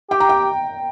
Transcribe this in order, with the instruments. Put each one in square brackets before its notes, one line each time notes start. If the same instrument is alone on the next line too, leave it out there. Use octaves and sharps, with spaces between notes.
[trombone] G4 [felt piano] G5
[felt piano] A#5
G5